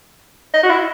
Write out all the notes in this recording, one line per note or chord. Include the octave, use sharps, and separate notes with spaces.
D#5
F#4
E4